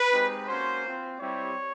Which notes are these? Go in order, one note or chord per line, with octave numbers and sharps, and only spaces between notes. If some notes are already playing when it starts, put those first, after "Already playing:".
Already playing: B4
G#3 C4 D#4 G4
A#3 C#4 F#4 C5
C4 F4
G3 C4 E4 G4 C#5